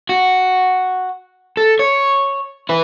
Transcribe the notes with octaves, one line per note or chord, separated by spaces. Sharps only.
F#4
A4
C#5
E4 B4